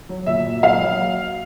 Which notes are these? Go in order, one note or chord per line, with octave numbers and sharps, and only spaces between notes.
F#3
A#2 E5
A#2
F#3 F5
F#3